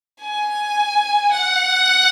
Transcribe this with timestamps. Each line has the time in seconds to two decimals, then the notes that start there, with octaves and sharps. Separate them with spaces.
0.21 G#5
1.32 F#5